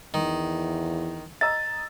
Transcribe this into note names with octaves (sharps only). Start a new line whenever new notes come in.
E2 D#3
D#5 A#5 E6 A6